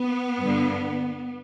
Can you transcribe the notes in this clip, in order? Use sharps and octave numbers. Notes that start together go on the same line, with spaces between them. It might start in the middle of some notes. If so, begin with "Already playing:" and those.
Already playing: B3
G2 D3